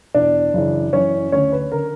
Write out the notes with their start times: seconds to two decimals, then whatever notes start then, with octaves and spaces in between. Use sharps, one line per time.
0.15 E2 B2 D4 D5
0.54 F#2 C#3 E3
0.93 F#2 E3 C#4 C#5
1.32 D2 D3 C#4 C#5
1.52 B4
1.72 D3 A#4